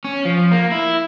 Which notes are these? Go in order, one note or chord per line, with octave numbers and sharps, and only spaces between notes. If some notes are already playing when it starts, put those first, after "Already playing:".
C#4
F3
A#3
E4